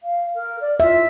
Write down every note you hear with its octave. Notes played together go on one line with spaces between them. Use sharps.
F5
A#4
D5
F4 E5